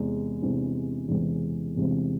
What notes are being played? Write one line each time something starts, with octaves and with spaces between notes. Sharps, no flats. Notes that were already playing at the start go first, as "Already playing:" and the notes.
Already playing: E2 C3 E3 G#3 C4
E2 C3 E3 G#3 C4
E2 C3 E3 G#3 C4
E2 C3 E3 G#3 C4